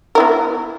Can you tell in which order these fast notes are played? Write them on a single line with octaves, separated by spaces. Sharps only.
A#4 E4 B3